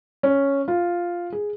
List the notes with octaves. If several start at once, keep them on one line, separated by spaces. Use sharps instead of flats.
C#4
F4
G#4